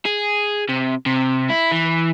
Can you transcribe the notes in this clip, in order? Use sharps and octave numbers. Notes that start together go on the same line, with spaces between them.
G#4
C3
C3
E4
E3